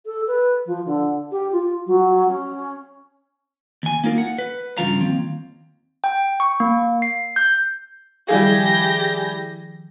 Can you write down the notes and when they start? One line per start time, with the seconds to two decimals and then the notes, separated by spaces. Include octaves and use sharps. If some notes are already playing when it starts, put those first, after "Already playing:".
0.05 A4
0.27 B4
0.65 F3
0.86 D3
1.31 G4
1.52 F4
1.86 F#3
2.28 C#4
3.83 D#2 G#5
4.04 A#3 D#4 F4 A#4
4.18 F#5
4.38 B4
4.78 G2 C#3 F3 F4 F5 A#5
5.00 D#2 C4
6.04 G5
6.40 C#6
6.60 A#3
7.02 C7
7.36 G6
8.28 D#3 F3 G3 E4 G4 G#4 F5 A#6